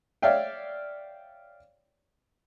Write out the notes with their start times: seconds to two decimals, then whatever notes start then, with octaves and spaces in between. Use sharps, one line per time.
0.22 C#5 D5 E5 F5 G5